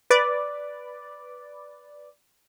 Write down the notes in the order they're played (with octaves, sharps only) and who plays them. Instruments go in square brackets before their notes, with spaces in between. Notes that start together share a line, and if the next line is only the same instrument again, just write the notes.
[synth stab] B4 D5